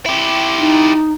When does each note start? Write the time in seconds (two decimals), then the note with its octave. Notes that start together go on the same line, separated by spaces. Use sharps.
0.06 E4 G4
0.58 D#4